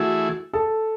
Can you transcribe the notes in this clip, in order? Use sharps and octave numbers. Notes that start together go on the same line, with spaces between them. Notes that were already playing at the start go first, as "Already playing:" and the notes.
Already playing: E3 A3 E4 F#4 G#4
A4